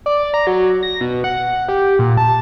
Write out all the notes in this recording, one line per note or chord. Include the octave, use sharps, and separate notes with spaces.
D5
A#5
F#3
A#6
B2
F#5
G4
A#2
A5